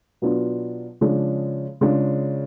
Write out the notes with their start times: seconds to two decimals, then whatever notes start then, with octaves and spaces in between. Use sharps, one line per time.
0.22 B2 F#3 B3 D4 F4
1.01 C#3 F3 G#3 D4
1.81 C#3 G#3 D4 F4